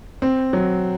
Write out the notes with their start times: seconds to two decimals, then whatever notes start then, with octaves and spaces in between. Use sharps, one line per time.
0.22 C4
0.53 F#3